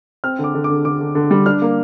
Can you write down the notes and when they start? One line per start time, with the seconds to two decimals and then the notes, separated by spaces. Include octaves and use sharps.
0.24 C4 F6
0.39 D3
0.44 D6
0.55 D3
0.64 D6
0.70 D3
0.85 D3 D6
1.00 D3
1.15 D3
1.31 G3
1.46 D4 F6
1.62 A#3